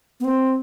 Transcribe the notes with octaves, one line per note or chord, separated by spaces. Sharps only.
B3
C4